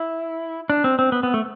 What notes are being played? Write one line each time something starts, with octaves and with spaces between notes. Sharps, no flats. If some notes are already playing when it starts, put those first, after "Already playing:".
Already playing: E4
D4
C4
C4
B3
B3
A3